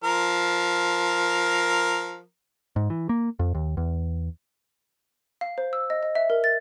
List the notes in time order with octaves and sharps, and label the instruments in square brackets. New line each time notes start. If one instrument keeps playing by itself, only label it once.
[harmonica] F3 A#4
[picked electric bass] G#2
E3
A#3
F2
D#2
E2
[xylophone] F5
C5
E6
D#5
D#5
E5
A#4
A6